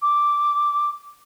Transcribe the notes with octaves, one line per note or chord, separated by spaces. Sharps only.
D6